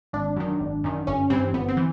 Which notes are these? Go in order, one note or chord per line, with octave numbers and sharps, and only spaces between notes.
G#1 D4
F#2 D#3
G#1
F#2 D#3
G1 C#4
G2 E3 C4
G1 B3
C4
E3